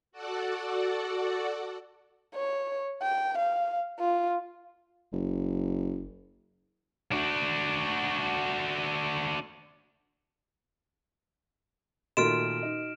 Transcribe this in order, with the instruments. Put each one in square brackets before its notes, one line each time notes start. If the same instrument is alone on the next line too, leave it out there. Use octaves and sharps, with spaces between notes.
[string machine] F#4 A4 D5 F#5
[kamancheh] C#5
G5
F5
F4
[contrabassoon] F#1
[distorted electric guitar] D4 F#4
[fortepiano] A#2 D#3 A3 [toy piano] F#4 D#5 [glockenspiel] F6 D7 E7
[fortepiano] D#4